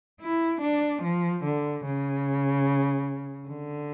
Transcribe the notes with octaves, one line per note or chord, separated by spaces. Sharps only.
E4
D4
F3
D3
C#3
D3